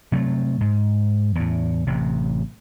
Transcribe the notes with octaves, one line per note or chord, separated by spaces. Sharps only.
C3 F#3 A3
G#2
E2 A2
A1 C3